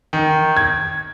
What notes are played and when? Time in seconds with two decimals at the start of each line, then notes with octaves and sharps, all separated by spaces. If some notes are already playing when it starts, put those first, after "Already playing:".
0.13 D#3
0.57 G#6